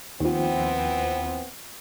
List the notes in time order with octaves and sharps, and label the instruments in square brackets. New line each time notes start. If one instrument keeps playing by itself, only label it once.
[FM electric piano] D#2 F3 [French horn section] E3 B3 C4